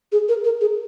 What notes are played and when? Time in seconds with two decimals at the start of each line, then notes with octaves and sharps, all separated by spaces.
0.12 G#4
0.28 A#4
0.44 A#4
0.61 G#4